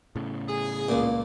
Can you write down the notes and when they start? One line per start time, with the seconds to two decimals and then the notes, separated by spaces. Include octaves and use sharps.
0.16 A2 C#3
0.48 G#4
0.89 C#2 A#2 A#3